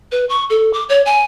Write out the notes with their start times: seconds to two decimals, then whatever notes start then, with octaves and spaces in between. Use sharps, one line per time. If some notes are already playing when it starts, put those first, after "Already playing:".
0.12 B4
0.29 C#6
0.50 A4
0.73 D6
0.89 C#5
1.06 G#5